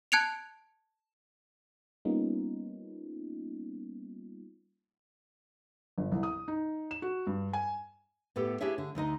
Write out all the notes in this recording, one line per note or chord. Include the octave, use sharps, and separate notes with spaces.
A5 F#6 G#6 C#7 D7 F7
G3 A#3 B3 C#4 D#4 F4
G1
C2
D#6
D#4
E7
F#4
G2
G#5
A2 B3 G4 A4
D4 E4 G4 G#4 C#5 E5
D3
D2 D3 D#4 D#5